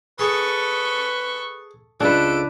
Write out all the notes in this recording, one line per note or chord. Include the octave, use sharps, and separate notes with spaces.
G#4 A4 B4 C#6
C#2 D4 A4 B4 D7